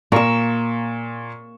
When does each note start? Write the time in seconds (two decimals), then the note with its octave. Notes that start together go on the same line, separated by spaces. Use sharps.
0.12 A#2 A#3 C#6 E6